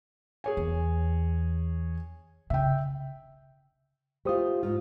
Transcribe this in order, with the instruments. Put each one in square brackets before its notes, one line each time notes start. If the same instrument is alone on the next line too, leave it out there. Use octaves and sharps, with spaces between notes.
[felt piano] G#4 C#5 G#5
[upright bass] E2
[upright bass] C#3 [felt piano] E5 G5
[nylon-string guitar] A3 F4 [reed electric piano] G4 C5 D#6
[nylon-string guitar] G#2 F4